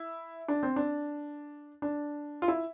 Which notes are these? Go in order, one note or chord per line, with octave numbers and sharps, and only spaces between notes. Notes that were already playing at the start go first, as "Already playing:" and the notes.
Already playing: E4
D4
C4
D4
D4
F4
E4